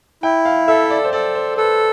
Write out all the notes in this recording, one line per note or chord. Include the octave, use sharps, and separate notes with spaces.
E4 G5
F5
A4 E5
D5
C5
A4 D5
C5
A4 B4